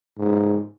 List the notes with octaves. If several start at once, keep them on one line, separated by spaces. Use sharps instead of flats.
G#2